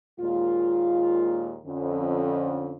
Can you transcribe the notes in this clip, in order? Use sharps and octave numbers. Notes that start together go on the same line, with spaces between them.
D#2 A#2 G#3 F4
F2 D3 C#4